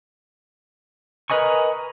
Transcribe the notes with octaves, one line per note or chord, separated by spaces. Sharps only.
A#4 B4 D#5 G#5 C#6